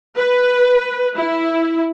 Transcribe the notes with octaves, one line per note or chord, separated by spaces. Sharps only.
B4
E4